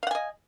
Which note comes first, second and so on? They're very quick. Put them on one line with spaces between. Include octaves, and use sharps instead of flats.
F5 F#5 G#5 D#5